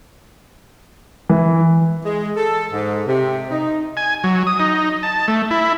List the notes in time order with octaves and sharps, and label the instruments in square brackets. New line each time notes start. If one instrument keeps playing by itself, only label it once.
[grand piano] E3
[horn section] G#3
A4
G#2
C3
D#4
[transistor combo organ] G#5
F#3
D#6
D#4
A5
A3
E4